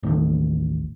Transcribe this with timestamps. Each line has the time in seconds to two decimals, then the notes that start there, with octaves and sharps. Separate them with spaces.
0.03 A1 D#2 D#3 A3